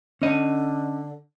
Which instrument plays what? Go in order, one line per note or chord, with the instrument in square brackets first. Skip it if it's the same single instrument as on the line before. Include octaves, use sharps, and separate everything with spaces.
[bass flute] D3 [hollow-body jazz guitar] C#4 D#5